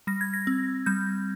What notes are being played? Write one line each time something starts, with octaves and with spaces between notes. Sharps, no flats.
G3 A#6
G#6
A#6
C4
G3 G6